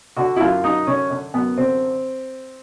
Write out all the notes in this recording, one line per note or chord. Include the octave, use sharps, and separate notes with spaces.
D3 F#4
E4
F#2 F4
F#2 D#4
D3 C#4
D3
F#2 B3
D3 C4